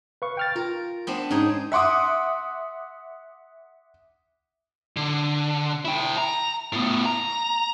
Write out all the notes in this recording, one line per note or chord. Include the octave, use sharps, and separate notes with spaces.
B4 F5 C#6
G5 F6 A6
F4 A#4
B3 C4 D4
G#2 C#4 D#4 G#4
E5 F#5 C6 D6 D#6
D3
E4 G5
A#5
A2 B3
A#5